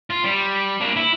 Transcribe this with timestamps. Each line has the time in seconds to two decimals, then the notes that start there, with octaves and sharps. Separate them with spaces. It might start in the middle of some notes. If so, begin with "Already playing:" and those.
0.10 F4
0.24 G3
0.81 A#3 D4
0.96 E4